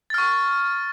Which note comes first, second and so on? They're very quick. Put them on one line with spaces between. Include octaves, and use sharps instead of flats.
A6 F6 C#6